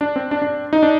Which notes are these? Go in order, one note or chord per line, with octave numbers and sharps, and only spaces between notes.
D4
C4
D4
D4
D#4
D4